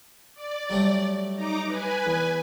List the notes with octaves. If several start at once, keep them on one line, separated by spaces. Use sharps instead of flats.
D5
F#3 G3 A3
D#4 A#5 D6
B4 G#5
E2